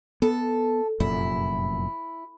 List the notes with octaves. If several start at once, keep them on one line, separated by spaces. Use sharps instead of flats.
B3 A4
F1 F#2 A#2 E4